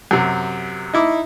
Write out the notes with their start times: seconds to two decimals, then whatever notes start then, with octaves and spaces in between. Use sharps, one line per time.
0.11 F#2 C3
0.93 D#4 E4 D6